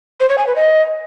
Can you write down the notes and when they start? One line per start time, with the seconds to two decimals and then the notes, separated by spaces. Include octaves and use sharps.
0.20 C5
0.29 C#5
0.38 G#5
0.47 B4
0.56 D#5